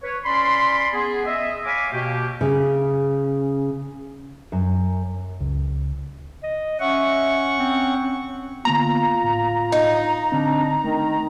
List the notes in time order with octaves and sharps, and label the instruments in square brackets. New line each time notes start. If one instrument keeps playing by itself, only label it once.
[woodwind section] B4 C#5
C#4 D5 B5 C6
B3 G#4
D#5 E5
C#5 F5 G#5 B5 D6
B2 A#3 G4
[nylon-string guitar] C#3
F#2
[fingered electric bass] C#2
[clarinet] D#5
[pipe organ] C#4 F#5 C#6 [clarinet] E5
[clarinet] C4
[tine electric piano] D3 A#3 B3 [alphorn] F4 [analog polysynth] A#5
[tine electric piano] A2
[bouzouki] D#4
[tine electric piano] D3 C4 [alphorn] D4
[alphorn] D#3 [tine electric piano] A3